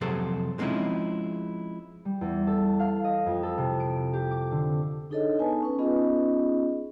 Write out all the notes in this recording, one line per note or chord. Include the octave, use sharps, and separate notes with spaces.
F2 C3 F#3 G#4 A4 C5
F3 G#3 C4 C#4 D#4 E4
G3
E2
A4
F5
D#5
F2
A4
C3
D7
G4
D6
D3
D4 D#4 G#4 A4 C#5 D#5
B3 D#4 B4 G#5 A5
C#4 B4
B3 C#4 D#4 F4 G#4 D#5